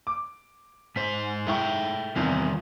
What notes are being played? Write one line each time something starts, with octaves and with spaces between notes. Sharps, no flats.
D6
G#2 C5 B6
G#2 E4 A4 E5 G5 C#6
E2 C3 D#3 E3 G3 F4